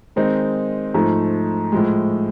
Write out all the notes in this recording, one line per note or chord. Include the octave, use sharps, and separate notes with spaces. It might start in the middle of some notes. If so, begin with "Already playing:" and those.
D#3 G#3 C4 D#4
G#2 F3 A3
A2 F3 G#3